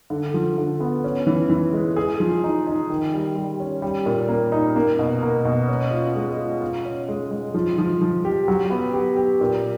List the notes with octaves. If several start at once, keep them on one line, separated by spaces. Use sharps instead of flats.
D3
F3
D3
B3
C#4
E3
E3
G#3
G#4
F3
D#4
D#4
D#3
G3
G3
C#4
G3
A#2
A#3
D#4
A#3
B2
A#3
B2
C#4
F4
G#3
F4
F4
C#4
G#3
G#3
F3
F3
F3
G4
F#3
B3
G4
G4
A#2